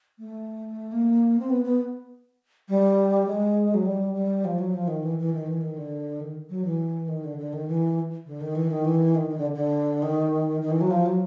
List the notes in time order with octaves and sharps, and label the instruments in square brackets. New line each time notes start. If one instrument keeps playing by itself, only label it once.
[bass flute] A3
A#3
C4
B3
B3
G3
G#3
F#3
G3
G3
F3
F#3
F3
D#3
E3
E3
D#3
E3
D#3
D3
D#3
F#3
E3
D#3
D3
D3
D#3
E3
D3
D#3
E3
D#3
E3
D#3
D#3
D3
D3
D#3
D#3
E3
F#3
F3
F#3